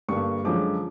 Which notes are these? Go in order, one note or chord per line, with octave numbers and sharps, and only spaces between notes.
G2 D3 G3 A#3 C#6
F#2 D3 F3 G#3 D6